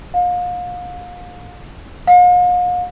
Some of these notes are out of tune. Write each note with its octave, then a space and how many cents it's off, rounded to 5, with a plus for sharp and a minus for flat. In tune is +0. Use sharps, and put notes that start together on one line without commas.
F5 +35
F5 +45